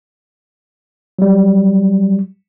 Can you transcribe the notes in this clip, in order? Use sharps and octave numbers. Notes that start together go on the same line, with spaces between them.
F#3 G3